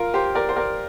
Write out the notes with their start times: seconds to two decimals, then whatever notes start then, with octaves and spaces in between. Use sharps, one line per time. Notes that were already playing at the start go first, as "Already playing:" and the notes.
Already playing: F4 A#4
0.14 G4 C5
0.35 A#4 D5
0.49 C5
0.56 A#4 D5